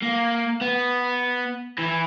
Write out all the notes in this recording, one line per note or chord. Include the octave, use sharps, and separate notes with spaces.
A#3
B3
E3